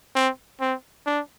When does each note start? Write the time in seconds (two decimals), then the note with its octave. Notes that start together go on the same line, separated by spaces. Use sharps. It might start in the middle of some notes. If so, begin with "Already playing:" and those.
0.15 C4
0.60 C4
1.06 D4